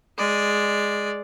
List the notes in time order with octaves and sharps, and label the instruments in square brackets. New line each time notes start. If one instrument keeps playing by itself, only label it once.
[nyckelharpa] G#3 D5